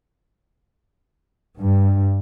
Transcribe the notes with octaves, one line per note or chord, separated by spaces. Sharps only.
G2